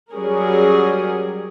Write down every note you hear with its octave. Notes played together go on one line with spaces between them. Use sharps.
F#3 G3 C#4 G#4 A#4